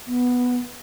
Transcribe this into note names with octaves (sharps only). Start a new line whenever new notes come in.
B3